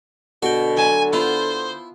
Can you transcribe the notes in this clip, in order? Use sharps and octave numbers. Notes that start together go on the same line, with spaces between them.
B2 D3 F#4 G5
F#3 G#5 A5 C6
B3 E4 F4 C5